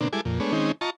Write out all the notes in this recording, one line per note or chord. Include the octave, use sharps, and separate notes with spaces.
B2 D3 A#3 C4 D4
G3 G#3 E4 A4 G#5 D6
F2 A#2
G#3 A3 B3 D4 C#5
D#3 G#3 C4 C#4 D#4
F4 D#5 A5 A#5 C#6